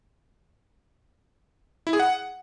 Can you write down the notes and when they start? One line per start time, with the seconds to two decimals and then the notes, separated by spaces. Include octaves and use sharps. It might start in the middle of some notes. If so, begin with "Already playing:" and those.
1.87 E4
1.93 G#4
2.00 F#5